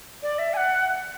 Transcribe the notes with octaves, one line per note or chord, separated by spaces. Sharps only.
D5
E5
G#5
F#5